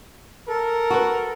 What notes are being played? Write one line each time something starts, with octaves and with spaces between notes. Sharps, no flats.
A4 A#4
F#4 B4